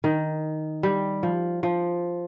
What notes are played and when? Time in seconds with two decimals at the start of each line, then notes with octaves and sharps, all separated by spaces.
0.04 D#3
0.83 G3
1.23 F3
1.63 F3